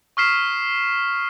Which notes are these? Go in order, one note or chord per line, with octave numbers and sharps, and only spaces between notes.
C#6 D#6 F6 B6 C7 E7